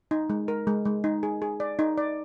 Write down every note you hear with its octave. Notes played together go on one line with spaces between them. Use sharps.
D#4
G#3
A#4
G#3
G#3
D#4
G#4
G#4
D5
D#4
D5